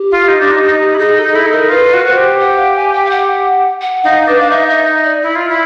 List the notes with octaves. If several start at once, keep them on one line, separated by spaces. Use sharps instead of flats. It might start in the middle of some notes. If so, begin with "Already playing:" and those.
Already playing: G4
F4
D#4
D4
D#4
D#4
E4
D#4 G#4
D#4 A4
E4 A4
D#4
A#4
F4 B4
F#4 B4
C5
G4
F#5
F5
G#5
G5
F5
F#5
F#5
D#4 F5
D4 B4
F5
D#4 E5
E5
D5
E4
F4
E4